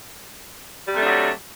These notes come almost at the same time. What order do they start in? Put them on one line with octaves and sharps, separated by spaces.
G3 C3 A3 D4 F#3